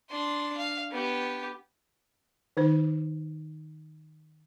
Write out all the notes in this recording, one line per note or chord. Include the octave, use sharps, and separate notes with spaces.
D4 C6
F5
B3 G4
D#3 D#4 C5